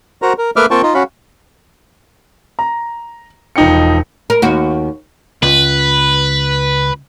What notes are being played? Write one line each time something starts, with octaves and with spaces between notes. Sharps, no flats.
F#4 A#4 C5 A#5
A#4
A3 A#3 B4 E5 D6 F6
A#3 C4 F4 G5 A5 C#6
D#4 F4
C#4 F#4 F5 B5
A#5
E1 F3 D#4 G5 C#7
A#4
D#2 F#4
C#2 B4